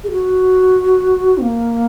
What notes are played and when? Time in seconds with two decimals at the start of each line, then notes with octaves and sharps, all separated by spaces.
0.04 G#4
0.11 F#4
1.38 C4
1.42 A#3